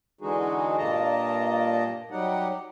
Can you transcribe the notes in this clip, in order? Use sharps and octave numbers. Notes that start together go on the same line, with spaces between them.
D3 E3 G#3 D#4 F#4 G#4
G2 A#2 A#3 D#5 A5 A#5
F#3 G3 D#4 G4 F#5